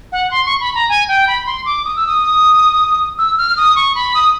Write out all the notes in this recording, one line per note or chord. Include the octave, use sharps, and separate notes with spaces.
F#5
C6
C#6
B5
A#5
G#5
G5
B5
C6
D6
D#6
E6
D#6
E6
F6
D#6
C#6
B5
D#6